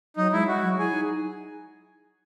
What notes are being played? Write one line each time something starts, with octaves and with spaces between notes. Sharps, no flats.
F#3 D#4
G#3 E4
F#4
F#3
E4 G#4
D#4